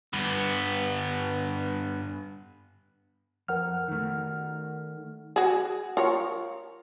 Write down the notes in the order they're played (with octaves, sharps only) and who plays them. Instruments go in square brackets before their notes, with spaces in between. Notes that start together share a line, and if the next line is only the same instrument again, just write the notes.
[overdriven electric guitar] G2 B3
[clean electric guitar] F2 [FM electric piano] A#4 F#5 F6
[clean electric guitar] D#3 A3
[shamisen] F#4 G#4
F4 A#4 C#5